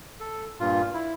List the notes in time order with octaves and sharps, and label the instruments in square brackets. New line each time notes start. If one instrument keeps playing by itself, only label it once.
[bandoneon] A4
G2 A#2 F4
E4